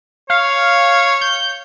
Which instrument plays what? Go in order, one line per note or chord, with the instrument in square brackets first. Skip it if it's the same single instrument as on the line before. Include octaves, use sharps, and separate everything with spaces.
[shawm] C#5 [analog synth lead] F5
[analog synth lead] G6